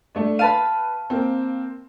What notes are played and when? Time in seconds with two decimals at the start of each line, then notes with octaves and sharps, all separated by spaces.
0.15 A3 D4
0.39 B4 F5 A5 B5 D#7
1.10 A#3 C4